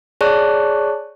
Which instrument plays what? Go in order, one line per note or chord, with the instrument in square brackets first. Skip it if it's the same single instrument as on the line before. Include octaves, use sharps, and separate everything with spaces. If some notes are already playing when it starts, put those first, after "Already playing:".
[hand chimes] G#4 C#5 D5 A5 C#6 F#6